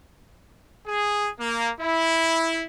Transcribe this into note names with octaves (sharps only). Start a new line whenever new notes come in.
G#4
A#3
E4